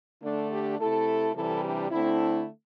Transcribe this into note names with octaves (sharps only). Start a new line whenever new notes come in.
D3 A3 D4
D4 G4
C3 A3 E4 A4
C3 E3 G3 E4 A4
D4 G4
D3 A3 C4 E4